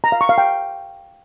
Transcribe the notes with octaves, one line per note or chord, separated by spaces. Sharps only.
A#5
F5
C#6
F5
G5